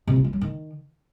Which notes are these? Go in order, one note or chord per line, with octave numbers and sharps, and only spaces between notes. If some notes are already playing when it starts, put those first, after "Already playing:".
C3
F4
E3
F#3
D#3